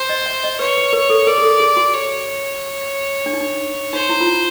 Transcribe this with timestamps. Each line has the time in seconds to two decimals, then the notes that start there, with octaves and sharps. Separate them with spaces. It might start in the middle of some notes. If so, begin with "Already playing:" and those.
Already playing: C5
0.09 D#5
0.26 E5
0.44 D#5
0.59 B4 C#5
0.77 B4
0.93 A#4
1.10 A4
1.27 A#4 D5
1.38 G#4
1.42 A4
1.60 G#4
1.77 F#4
1.94 C#5
3.26 D4
3.33 D#4
3.41 D4
3.93 D#4 C5
4.09 E4
4.20 F4
4.26 E4